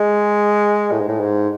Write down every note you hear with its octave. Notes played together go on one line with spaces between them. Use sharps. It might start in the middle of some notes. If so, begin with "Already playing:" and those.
Already playing: G#3
A2
G#2
A2
G#2